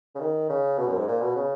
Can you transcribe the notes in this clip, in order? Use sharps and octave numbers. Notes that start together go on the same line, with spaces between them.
C#3
D#3
C#3
B2
F#2
G#2
A#2
B2
C#3